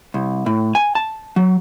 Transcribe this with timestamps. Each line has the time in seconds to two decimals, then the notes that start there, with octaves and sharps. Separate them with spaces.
0.14 C2
0.46 A2
0.75 G#5
0.95 A5
1.36 F#3